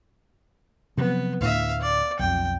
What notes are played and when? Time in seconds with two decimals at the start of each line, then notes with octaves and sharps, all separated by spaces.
0.97 C3 F3 F#3 B3
1.41 D2 A2 E5 F5
1.81 D5
2.19 B1 F2 G5